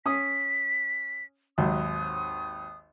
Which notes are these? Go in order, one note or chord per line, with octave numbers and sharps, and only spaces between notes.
C#4 D#6 B6
G#1 D#2 F#3 D#6